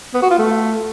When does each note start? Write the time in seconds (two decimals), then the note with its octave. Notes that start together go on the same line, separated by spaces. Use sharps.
0.14 B3
0.22 F#4
0.30 F4
0.39 A3